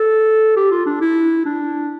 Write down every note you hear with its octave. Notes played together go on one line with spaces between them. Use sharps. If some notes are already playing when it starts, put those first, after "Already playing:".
Already playing: A4
G4
F4
D4
E4
D4